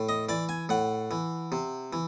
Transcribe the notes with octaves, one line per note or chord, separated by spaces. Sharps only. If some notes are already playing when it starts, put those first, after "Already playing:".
Already playing: A2
D#5
E3 D5
G#5
A2 F#5
E3
C3
E3